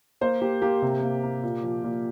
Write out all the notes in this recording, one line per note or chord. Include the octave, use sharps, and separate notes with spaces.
A#3 C5
A#3 G4
A#3 G4
C3
A#3
A#3
A#2
F3
A#2